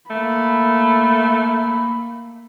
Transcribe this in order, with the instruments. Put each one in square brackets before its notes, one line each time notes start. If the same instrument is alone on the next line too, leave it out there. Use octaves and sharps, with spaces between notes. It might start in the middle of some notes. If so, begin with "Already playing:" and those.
[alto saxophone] A3 [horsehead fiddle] A#3 B5